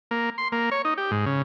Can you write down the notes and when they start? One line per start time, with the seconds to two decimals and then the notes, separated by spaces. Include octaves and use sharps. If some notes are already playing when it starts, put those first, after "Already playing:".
0.11 A#3
0.38 C6
0.52 A#3
0.71 C#5
0.85 D#4
0.98 G4
1.11 G#2
1.26 C#3